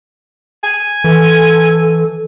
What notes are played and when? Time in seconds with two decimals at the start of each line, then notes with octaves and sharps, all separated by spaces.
0.64 G#5
1.04 E3 A4